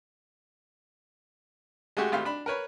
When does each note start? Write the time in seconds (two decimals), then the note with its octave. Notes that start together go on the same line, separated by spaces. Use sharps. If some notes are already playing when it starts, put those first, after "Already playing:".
1.97 G#3 A3 F#4 G4
2.12 G#1 A3 G4 F5 C6 F6
2.25 D4 B5
2.46 A#4 B4 C#5 B5